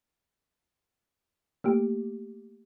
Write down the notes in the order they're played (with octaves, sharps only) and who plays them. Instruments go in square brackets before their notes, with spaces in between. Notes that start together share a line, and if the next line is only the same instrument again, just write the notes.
[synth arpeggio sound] A3 A#3 G4